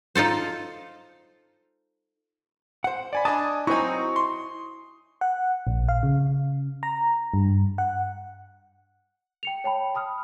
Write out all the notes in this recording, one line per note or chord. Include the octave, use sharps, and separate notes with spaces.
D#4 F4 A4 C5
C5 F#5
D5 G#5 B5
D4 D#5 G#5 A5 D#6
F#3 C4 D#4 E4 G#5 C#6
C6
F#5
A#1
F5
C#3
A#5
G2
F#5
G5 C#7 F7
C#5 G5 A5 B5
A5 B5 D#6 F6